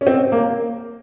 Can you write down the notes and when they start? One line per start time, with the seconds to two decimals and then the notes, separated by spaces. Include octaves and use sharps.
0.01 C#4
0.07 C4
0.32 A#3